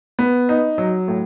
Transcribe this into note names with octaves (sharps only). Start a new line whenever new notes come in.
B3
D#4
F#3
A2